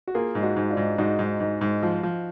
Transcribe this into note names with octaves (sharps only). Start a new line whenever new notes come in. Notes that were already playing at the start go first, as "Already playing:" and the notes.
F#4
A#3 F4 G#4
G#2
D#4 F#4
G#2
D4 F4
G#2
G#2 D#4 F#4
G#2
G#2
G#2
F3
F3